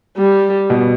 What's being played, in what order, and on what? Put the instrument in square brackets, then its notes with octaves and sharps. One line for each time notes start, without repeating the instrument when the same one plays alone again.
[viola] G3
[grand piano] B2